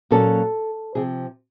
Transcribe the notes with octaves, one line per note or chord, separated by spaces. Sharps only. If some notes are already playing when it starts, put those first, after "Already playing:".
A#2 F#3 A#3 C#4 A4
C3 F3 G#4